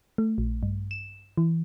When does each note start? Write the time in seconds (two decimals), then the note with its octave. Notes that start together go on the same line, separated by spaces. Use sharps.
0.18 A3
0.38 A#1
0.63 G2
0.91 E7
1.38 E3